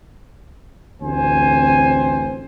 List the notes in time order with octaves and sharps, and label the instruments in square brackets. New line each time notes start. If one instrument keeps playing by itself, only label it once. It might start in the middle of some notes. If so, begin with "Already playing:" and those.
[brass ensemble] A1 D2 C4 C5 G#5